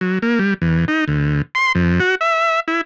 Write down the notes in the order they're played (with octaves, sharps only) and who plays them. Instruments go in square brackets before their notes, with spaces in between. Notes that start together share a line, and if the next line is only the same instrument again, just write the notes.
[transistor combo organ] F#3
A#3
G3
E2
D#4
D2
C6
F2
F#4
E5
E4